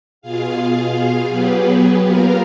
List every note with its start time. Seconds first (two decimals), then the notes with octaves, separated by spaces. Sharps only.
0.21 B2 F4 G#4 F5
1.28 F#3 B3 G4 G#4 B4
2.03 A#3 B3 F4 A#4 F5